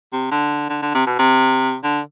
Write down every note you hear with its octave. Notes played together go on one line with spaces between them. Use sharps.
C3
D3
D3
D3
C3
B2
C3
D3